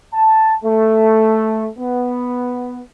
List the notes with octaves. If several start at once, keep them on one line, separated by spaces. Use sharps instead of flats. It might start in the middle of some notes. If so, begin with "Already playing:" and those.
A5
A3
B3